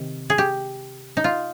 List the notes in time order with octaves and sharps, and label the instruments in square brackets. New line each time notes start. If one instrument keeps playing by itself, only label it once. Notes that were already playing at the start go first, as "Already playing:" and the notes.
Already playing: [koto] C3 D#3
G#4
G4
D#4
F4